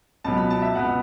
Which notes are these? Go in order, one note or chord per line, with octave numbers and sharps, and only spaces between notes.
C#2 B2 F#3 B3 A5
B5
A5
E5
C#2 B2 B3 F#5